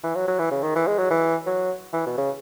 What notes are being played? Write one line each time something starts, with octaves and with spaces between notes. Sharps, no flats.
E3
F#3
F#3
E3
C#3
D#3
E3
G#3
F#3
E3
F#3
E3
B2
C#3